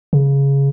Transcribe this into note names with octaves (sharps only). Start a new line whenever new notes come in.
C#3